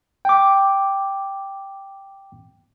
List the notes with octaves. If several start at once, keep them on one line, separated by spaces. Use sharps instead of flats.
G5 D6